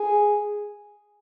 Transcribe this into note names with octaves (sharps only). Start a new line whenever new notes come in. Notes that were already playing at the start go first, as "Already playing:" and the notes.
Already playing: G#4